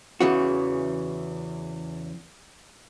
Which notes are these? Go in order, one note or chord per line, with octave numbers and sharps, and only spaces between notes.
E2 C#3 E3 F#4